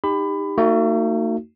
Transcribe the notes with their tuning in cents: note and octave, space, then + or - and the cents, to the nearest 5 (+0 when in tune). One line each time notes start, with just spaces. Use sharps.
D#4 +0 G4 +25 B5 +25
A3 +45 D#4 +0 F#4 +0